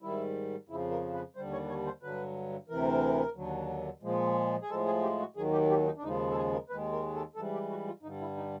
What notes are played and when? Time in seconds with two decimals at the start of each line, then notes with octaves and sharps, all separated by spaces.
0.02 G#2 D#3 G3 E4
0.69 F2 C#3 F3 E4
0.91 A#4
1.14 B4
1.36 D#2 D3 G3 C5
1.52 C#5
1.69 C#5
1.86 C5
2.03 G2 D3 F#3 B4
2.69 D2 C3 E3 A#4
3.35 D#2 D3 F#3
4.03 A#2 F3 G#3
4.62 G#4
4.70 A2 F3 G#3 A4
4.86 G#4
5.03 G4
5.20 F#4
5.36 D#2 D#3 F#3 G#4
5.52 G4
5.70 G4
5.86 D#4
5.97 D4
6.02 D#2 C#3 F3 G#3 D#4
6.31 A4
6.37 G#4
6.53 A#4
6.70 D#2 D#3 G#3 B4
6.92 A#4
7.14 A4
7.36 G#2 E3 G3 A4
7.54 G4
7.70 F#4
7.87 F4
8.03 G2 D3 G3 D#4
8.20 E4
8.37 D#4